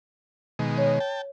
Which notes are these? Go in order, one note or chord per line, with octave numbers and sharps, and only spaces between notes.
B2 D#3 G#3
C#5
G5 A5